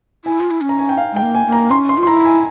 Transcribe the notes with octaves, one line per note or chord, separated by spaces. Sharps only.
E4 G#5
F4
E4
C#4
A#5
G#5
G5
F5
G#3 G5
A#3
G#5
A#3
A#5
C#4 C6
C6
F4
C6
E4 A#5
G#5